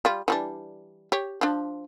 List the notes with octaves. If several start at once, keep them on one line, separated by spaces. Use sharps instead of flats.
G3 F4
E3 G3 D4
G4 C#5
F3 D4